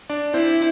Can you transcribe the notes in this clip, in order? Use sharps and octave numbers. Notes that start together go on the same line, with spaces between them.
D4 D5
C4 E4 C5